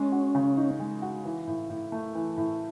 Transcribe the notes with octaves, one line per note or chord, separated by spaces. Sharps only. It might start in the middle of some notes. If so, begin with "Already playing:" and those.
Already playing: G#3 C#4
F#4
C#3
D#4
G#3
F#4
E3
A2
A2
A3
E3
A2